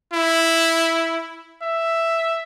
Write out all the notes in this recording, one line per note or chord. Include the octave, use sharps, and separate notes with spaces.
E4
E5